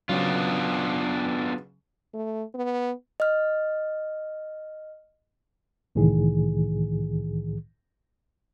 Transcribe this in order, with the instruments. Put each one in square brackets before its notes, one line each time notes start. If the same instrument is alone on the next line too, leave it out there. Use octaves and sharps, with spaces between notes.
[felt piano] C#3 F#3 [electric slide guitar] B3 D4 F4
[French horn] A3
B3
[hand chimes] D#5 F6
[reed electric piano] C2 A2 D#3 E3 G#4